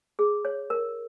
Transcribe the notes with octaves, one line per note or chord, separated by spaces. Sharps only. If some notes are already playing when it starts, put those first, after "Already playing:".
G#4
C#5
A#4